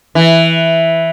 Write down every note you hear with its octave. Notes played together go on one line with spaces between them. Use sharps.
E3